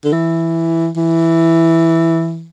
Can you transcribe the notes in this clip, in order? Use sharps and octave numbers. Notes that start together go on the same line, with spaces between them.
D3
E3
E3